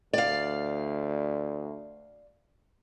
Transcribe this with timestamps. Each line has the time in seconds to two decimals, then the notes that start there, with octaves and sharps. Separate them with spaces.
0.13 D2 D5 F5